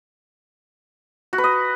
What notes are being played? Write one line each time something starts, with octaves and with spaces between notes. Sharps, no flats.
F#4
B4
D#5